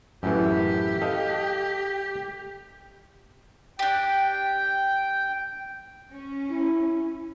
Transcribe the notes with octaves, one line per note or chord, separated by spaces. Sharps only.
F#2 A2 E3 G4
A4 D#5 F5
D4 G4 G5
C#4
E4